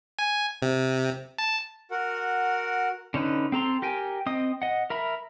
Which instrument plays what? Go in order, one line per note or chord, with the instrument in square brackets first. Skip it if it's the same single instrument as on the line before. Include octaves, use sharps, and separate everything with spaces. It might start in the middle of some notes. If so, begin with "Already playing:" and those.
[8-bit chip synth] G#5
C3
A5
[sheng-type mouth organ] F#4 A#4 F#5
[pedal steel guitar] D3 C#4 D#4 B4
C4 A4 A#5 C6
G4 A#4 G5 G#5
C4 D#5 D#6
D#5 F#5
A#4 E5 B5